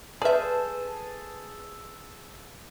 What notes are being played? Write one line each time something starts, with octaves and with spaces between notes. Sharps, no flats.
G#4 A4 B4 C5 D5 E5 A5